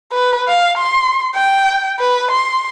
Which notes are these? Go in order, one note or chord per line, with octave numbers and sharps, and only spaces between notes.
B4
F5
C6
G5
B4
C6